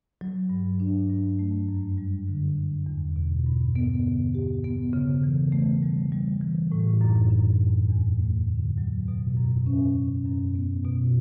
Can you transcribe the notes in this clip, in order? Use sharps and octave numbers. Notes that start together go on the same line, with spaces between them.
F#3
G2
D4
G2
A3
F#2
G3
D3
D3
E2
B2
G2
B3
D3
G4
B3
C#3
E3
A3
G3
G3
E3
A2
F#2
F#2
E2
E2
A3
D3
F#3
B2
F#2
C#4
C#4
F#2
B3
B2